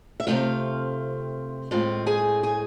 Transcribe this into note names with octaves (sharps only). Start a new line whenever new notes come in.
E5
C3 E3 A3 C4 F4 F5
A2 G#3 C4 F4 F5
G#4 G#5
G#4 G#5